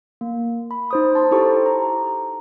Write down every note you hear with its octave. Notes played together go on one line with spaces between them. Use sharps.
A#3
B5
D#4 C5 D#6
A5 C6
D#4 E4 G4 A4 C5 C#6
A#5